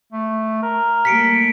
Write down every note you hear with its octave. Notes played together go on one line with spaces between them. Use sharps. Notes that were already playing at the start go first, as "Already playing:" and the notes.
A3
A#4
G3 A3 A#3 B6 C#7 D7